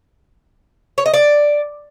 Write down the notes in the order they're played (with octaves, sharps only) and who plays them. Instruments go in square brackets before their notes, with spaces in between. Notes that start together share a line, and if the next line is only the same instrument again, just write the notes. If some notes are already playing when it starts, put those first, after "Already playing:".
[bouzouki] C#5
D#5
D5